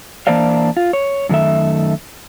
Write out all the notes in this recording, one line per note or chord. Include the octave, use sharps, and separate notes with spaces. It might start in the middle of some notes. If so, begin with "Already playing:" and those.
E3 A#3 D4 C5 D5 F5
F4
C#5
F#2 D#3 A3 E5